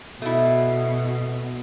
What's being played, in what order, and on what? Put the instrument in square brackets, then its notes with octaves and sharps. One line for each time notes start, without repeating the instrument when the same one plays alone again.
[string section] B2 [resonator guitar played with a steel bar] A3 E4